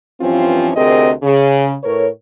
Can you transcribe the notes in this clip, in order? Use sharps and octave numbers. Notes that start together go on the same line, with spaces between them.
G2 E3 F3 C4 C#4 F4
D2 C3 C4 G#4 A#4 D#5
C#3
A2 A#4 B4 C#5